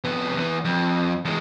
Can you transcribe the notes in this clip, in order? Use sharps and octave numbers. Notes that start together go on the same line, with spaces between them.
F2 B3
E2 B3
F2
E2 G#3